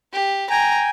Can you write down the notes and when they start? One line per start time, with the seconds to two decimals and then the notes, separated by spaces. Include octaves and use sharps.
0.13 G4
0.50 G5 G#5 A#5